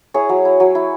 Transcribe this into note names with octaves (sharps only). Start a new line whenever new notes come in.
E4 G#4 C#5
F#3
E4
F#3
E4